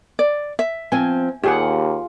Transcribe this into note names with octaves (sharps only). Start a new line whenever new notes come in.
D5
E5
F3 C4 G#5
D#2 F4 G4 G#4 F#5